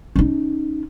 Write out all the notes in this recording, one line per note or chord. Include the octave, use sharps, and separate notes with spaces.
C#4 D#4